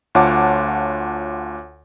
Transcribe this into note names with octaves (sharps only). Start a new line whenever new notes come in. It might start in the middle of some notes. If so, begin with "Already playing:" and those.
D2 F4 C#5 F#5 A5 D6